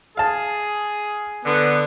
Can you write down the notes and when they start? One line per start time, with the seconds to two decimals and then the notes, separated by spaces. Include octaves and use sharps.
0.17 G#4 F5 A5
1.46 D3 B3